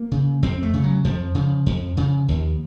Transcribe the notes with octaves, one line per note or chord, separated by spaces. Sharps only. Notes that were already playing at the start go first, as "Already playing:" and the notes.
Already playing: A#3
C#3
F2 C4
A3
C#3
F#3
F2 F3
C#3
F2
C#3
D#2